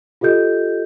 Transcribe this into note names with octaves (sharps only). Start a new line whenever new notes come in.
F4 G4 A4 D#5 G6